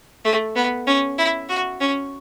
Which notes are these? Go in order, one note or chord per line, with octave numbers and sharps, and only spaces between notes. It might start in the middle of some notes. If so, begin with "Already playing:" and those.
A3
B3
C#4
E4
F#4
C#4